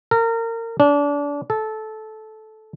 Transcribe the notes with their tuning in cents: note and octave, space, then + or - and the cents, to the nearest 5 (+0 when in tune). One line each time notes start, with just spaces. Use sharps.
A#4 -30
D4 -30
A4 -15